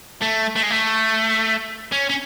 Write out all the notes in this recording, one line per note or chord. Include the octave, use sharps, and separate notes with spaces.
A3
A3
G#3
A3
C#4
C#4